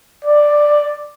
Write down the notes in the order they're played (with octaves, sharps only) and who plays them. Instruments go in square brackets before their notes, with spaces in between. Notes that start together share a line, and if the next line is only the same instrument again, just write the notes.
[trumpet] D5